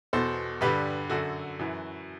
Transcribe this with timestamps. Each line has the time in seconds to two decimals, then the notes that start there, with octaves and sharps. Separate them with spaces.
0.13 E2 B2 A4 C5
0.61 G2 D3 G4 B4
1.10 F#2 D3 F#4 A4
1.59 F#2 E3